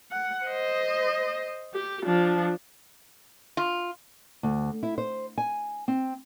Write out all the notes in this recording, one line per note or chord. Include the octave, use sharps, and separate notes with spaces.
F#5
C5 D#5
G4
F3 D4
F4
D2
E4
C5
G#5
C4